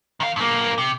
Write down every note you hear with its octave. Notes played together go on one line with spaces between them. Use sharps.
D#3 F5
G2 A#3
C3